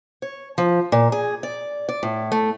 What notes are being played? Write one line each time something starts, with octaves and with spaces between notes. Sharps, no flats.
C#5
F3
A#2
G#4
D5
D5
A2
A3